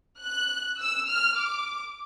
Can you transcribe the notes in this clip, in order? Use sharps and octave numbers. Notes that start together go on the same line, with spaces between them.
F#6
E6
F6
D6